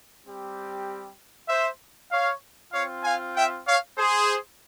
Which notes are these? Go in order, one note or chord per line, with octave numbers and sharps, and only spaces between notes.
G3 C4 G4
C5 E5
C#5 F5
C4 F4 C#5 F5
F5 G#5
E5 G5
C#5 F5
G#4 C5